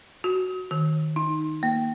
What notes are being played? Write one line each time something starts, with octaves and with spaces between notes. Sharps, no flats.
F#4
D#3
D#4
A#3